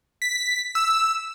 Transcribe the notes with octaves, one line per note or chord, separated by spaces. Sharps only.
B6
E6